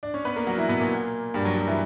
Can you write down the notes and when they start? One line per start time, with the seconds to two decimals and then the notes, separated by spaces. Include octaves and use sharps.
0.03 D4 D5
0.14 C#4 C#5
0.25 B3 B4
0.36 A#3 A#4
0.47 F#3 F#4
0.58 E3 E4
0.68 B2 B3
0.80 A#2 A#3
1.34 G2 G3
1.45 F#3
1.57 F#3
1.67 E3